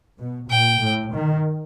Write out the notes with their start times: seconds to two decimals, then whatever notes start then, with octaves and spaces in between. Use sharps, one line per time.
0.18 B2
0.50 A#2 G5
0.82 A2
1.14 D#3